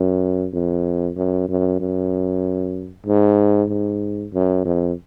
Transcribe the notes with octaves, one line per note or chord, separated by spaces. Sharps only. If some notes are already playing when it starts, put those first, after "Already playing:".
Already playing: F#2
F2
F#2
F#2
F#2
G#2
G#2
F#2
F2